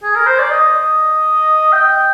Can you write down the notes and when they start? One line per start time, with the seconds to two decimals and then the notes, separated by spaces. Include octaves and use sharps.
0.03 G#4
0.16 A#4
0.27 C5
0.39 D5
0.51 D#5
1.73 G5